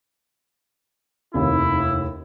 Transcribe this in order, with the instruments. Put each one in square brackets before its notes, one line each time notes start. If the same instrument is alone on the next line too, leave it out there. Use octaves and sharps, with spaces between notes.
[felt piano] F1 D#2 [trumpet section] E4